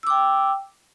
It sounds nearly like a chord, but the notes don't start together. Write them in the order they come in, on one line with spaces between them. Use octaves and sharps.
E6 D6 G5